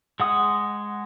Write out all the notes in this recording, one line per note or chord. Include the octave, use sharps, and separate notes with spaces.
G#3 F#5 D#6